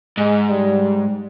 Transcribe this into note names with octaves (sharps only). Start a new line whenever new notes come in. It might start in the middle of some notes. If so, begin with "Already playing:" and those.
G#2 G#3
G3